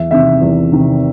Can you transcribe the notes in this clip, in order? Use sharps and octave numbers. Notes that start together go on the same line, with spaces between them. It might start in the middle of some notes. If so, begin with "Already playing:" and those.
Already playing: E2 E5
C3 D#3 E5
E2
C3 D#3